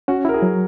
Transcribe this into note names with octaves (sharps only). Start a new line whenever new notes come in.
C#4 F#4
E4 A#4
G#4
F#3